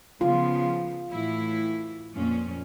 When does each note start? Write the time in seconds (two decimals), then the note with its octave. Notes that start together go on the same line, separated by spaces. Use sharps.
0.21 C#3 F3 B3 F4
1.11 A2 E3 E4
2.15 F2 A#2 C#4